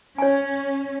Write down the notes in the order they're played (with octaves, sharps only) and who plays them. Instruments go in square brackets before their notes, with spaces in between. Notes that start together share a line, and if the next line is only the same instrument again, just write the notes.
[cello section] C#4 [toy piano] C#5 G#5